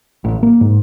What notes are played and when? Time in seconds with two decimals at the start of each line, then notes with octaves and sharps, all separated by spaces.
0.24 A1
0.43 A#3
0.61 G#2